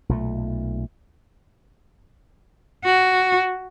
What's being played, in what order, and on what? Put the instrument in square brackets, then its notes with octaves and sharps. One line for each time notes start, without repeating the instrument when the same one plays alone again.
[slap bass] B1 A#2 A3
[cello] F#4